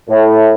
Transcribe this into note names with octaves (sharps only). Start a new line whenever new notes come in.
A2